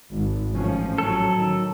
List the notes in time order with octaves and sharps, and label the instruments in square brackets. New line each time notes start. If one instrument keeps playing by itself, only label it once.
[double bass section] G#1
A1 F3 C#4
[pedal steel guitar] F#3 A4
[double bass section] D#3